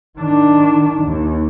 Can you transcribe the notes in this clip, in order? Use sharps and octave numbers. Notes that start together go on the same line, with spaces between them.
D#3 D4
D#2